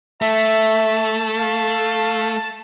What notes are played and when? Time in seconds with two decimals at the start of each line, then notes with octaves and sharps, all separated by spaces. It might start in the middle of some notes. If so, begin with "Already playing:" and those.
0.22 A3 E5 A5
1.37 F5